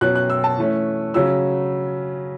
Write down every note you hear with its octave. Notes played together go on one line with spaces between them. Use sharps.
B2 F#3 C#4 F#6
F#6
E6
A5
E3 A3 C#4
C#3 F#3 C#4 E6